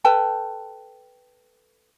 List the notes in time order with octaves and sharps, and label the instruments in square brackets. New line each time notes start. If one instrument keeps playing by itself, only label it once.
[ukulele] A4 B4 G5 A5